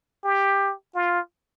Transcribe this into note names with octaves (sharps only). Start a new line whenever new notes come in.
G4
F4